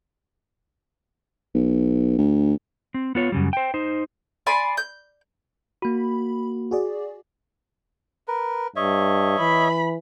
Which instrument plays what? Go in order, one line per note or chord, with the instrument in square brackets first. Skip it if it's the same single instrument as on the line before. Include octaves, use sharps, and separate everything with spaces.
[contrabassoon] B1
D2
[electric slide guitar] C4
B3 F4 C#5
F#2 C#3 G3
C5 G5
D#4 C5
[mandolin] D5 G#5 B5 C6
G6
[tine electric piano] A#3 F#4 [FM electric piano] B5
[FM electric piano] F#4 G#4 D5
[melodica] A#4 B4
[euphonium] G2 [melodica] C#5 D#5 E5
[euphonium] E3 [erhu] B5